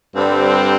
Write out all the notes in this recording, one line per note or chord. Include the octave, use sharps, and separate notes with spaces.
G2 D3 G3 C4